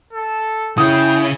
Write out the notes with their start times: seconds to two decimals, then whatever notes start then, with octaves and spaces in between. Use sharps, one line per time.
0.13 A4
0.78 C#3 E4 G5 D#6